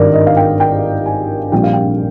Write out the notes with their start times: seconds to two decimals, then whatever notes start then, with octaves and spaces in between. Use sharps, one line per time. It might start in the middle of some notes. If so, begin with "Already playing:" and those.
Already playing: G#1 G2 D#3 A#4 D5
0.13 D#5
0.27 F5
0.37 G5
0.60 G5
1.06 G#5
1.52 A#1 A#2 G3 C4 G5
1.63 F5
1.73 G5